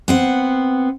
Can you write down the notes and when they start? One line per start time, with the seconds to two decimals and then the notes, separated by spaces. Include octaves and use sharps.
0.08 B3 C4 F#5